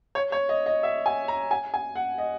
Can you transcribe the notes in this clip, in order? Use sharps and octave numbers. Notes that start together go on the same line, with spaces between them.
C#5
C#5
D#5
D#5
E5
G#5
A#5
G#5
G#5
F#5
D#5